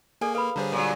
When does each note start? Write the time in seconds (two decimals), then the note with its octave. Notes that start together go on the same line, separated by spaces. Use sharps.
0.21 A#3 G#4 A4 D5 G#5
0.35 A4 B4 F5 B5
0.56 D3 G3 G#4 C5 C#5 A#5
0.72 A#2 F#3